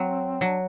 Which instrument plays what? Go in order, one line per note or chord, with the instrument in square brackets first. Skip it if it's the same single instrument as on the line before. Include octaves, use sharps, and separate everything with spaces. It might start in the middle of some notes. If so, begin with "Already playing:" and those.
Already playing: [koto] F#3 [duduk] C4
[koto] F#3 [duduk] D4